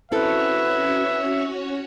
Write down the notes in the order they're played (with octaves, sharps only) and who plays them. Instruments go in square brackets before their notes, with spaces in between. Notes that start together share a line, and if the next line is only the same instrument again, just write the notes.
[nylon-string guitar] C4 E4 A4 [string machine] C#4 F#4 C#5 [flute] B4 [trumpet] E5